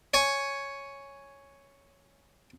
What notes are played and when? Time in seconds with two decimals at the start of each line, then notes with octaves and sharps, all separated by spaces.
0.14 C#5 G#5 C#6